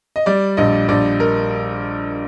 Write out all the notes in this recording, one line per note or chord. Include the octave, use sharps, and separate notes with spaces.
D#5
G3 D5
A#1 D#5
A#1 D5
A#4